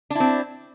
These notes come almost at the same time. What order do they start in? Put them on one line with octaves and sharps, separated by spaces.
D4 E4 C4